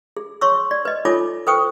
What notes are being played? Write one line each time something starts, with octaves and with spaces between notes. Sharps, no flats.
G#4
C#5 C6 C#6 E6
D5
B4 D#5
D#4 F4 A4 C#5 G#5 D6
A4 B4 C5 G5 C#6 D#6